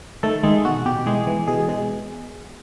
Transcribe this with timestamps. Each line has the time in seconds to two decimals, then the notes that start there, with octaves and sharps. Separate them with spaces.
0.23 D#3 A3 A4
0.43 D#3 G#3 G#4
0.65 B2 F#4
0.86 B2 G4
1.06 E3 G#3 G#4
1.27 E3
1.48 B2 G#3 G#4
1.68 B2 G#3 G#4